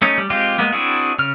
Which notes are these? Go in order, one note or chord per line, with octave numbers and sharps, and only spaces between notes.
A3 C#4 D#4
G3
G#3 C4 F4 G4
G#3 A#3 B3
C4 D4 E4 F#4 G#4
C#3 F6